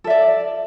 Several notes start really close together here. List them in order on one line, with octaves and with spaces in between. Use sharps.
A4 E5 D5